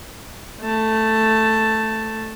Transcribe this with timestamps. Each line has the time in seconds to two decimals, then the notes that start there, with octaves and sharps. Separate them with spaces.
0.61 A3 A5